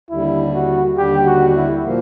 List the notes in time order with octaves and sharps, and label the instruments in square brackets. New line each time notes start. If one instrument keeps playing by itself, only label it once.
[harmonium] D#2 D3 G3 [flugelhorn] E4
[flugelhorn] F#4
[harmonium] D#2 D3 G3 [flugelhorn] G4
[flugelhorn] F#4
E4
[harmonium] A#2 F3 A#3